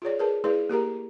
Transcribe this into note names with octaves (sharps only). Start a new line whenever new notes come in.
F4 G#4 C#5 D5
G#4 A#4 B4 A5
A3 E4 G#4 B4 D5
A#3 G4 A#4 A#5